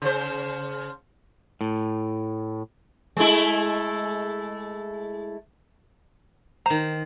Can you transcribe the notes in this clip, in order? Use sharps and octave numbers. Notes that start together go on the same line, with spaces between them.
C#3 C5
A2
G#3 A3 E4
D#3 C5 A#5